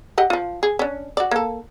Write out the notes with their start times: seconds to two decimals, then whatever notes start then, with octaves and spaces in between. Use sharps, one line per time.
0.18 G4 D#5 F#5
0.30 F3 F4
0.63 G#4
0.79 C#4 D4
1.17 F#4 D5
1.31 A#3 A4